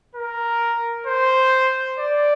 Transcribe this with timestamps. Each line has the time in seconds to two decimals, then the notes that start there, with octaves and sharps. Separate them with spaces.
0.15 A#4
1.07 C5
1.99 D5